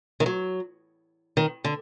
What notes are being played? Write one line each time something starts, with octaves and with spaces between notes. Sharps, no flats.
D#3
F#3
D#3
D3